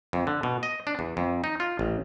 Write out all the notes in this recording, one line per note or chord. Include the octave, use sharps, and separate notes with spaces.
F2
D3
B2
D#5
D4
E2
F2
D#4
F4
A1